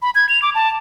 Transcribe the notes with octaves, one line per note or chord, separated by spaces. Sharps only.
B5
G#6
F7
D6
A5